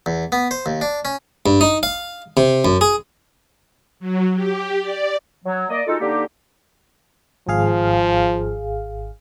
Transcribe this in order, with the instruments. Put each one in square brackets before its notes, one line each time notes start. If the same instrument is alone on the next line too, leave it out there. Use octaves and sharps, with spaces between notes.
[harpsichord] E2
B3
C5
D#2
D4
C#4
G2
D#4
F5
C3
F#2
G#4
[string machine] F#3
G4
D5
[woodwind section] F#3
A#3 D5 D#5
G#3 D#4 F4 F#4 A4
D3 A#3 D#4 G4
[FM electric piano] G#1 G#4 F5 [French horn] F3